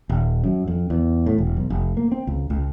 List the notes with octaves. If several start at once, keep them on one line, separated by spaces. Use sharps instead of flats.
D#1
F#2
F2
E2
A2
E1
B1
F1
A#3
C4
C#2
C#2